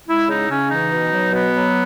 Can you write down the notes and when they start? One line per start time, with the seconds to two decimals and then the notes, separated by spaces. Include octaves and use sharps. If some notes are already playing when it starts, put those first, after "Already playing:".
0.07 G#3 E4
0.28 C#3 D#4
0.49 C#3 C#4
0.70 E3 D#4
0.90 B2
1.12 F#3
1.32 B2 B3
1.53 F#3